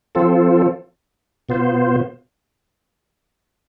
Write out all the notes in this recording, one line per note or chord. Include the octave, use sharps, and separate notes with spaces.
F3 C4 F4 A4
B2 B3 F4 C5